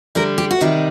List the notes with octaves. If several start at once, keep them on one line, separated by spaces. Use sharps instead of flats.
D3 G3 D4 A#4
G4
F#4
C3 D#3 G3 D#4